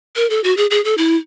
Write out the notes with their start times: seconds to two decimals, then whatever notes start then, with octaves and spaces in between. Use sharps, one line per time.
0.16 A#4
0.30 A4
0.44 F#4
0.57 G#4
0.70 G#4
0.84 A4
0.98 E4